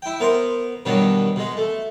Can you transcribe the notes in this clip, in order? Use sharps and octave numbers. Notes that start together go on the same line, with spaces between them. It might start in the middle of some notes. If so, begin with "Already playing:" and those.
E4 G5
B3 A#4 C5
G2 B2 D#3 F#3 B3 D4
B2 G#3
A3